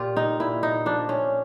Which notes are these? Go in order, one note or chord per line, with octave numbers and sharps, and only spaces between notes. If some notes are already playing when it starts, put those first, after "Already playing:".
Already playing: A#2 F4 G4
D#4
A#2 E4
D#4
F3 D4
C#4